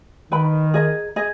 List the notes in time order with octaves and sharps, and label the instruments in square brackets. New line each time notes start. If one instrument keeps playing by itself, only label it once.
[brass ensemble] D#3 [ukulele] B4 G5 B5
[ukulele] G#4 D#5 A#5
G#4 D#5